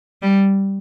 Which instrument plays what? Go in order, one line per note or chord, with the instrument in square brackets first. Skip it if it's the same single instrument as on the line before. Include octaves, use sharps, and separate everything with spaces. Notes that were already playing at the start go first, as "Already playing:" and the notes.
[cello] G3